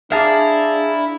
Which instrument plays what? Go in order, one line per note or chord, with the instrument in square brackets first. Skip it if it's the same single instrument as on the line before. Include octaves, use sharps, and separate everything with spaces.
[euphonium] D4 [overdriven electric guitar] E4 [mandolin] G#4 D5 [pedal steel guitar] F5 A5 A#5